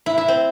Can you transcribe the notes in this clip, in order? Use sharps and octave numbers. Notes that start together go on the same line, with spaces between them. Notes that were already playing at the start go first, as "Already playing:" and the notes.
E4
E4
C4